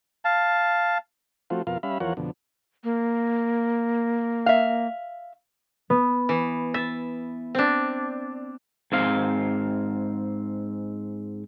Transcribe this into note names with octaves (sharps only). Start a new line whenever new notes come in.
F5 A5
F3 A3 C4 F4 F#4
F2 B2 F4 A#4 F5
G3 C#4 E5 F5 B5
E2 F3 F4 A#4 C#5 F#5
F2 B2 D3
A#3
E5 F5
B3
E3
E5 A6
C4 D4
G#2 C4 F5